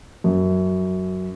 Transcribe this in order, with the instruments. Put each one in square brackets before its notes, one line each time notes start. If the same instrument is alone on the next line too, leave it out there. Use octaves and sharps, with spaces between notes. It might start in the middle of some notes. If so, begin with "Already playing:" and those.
[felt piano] F#2